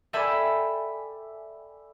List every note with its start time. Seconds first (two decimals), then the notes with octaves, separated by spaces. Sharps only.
0.13 A4 D5 E5 G5 G#5 B5